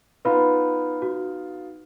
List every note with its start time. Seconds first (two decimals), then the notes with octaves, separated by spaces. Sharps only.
0.25 B3 D#4 F4 B4 B5
1.02 F#4